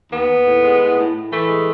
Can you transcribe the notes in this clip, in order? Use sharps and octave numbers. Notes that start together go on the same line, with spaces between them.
D#2 B3
D#2
A2
G#3
A2
A2
A2
E3 A3
G#3